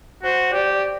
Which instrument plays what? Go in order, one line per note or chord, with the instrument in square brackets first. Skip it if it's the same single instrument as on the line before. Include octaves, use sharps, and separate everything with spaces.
[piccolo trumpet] F#4 [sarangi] C5
[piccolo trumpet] G4 [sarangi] D5